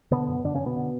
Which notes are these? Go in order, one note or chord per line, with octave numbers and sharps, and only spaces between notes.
B2 D3 B3
F#2
F#2 D3 D4
C#3 C#4
D3
B2 B3
D3